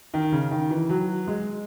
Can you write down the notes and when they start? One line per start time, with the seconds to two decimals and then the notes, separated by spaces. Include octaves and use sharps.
0.14 D#3
0.32 C#3
0.51 D#3
0.70 E3
0.89 F#3
1.27 G#3